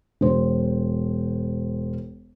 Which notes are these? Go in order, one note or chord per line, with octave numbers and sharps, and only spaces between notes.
E1 C5